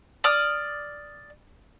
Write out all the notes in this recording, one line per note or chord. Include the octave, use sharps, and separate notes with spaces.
D5 D#6 F6